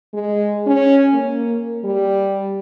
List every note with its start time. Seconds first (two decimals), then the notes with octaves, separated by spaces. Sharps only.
0.13 G#3
0.66 C#4
1.14 A#3
1.84 G3